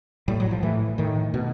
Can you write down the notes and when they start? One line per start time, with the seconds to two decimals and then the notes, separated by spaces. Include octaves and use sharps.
0.28 A2 G3
0.40 F#3
0.51 F3
0.63 A2 E3
0.98 A2 D#3
1.34 B2